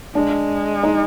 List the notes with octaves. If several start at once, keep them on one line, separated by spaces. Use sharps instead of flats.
G#3 D4
D#4